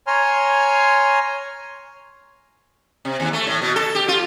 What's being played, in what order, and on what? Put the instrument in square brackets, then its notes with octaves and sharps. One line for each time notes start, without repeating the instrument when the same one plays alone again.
[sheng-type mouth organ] C#5 G#5 A#5 C6 F6
[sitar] C3
D#2
A3
A2
B2
A4
G4
F4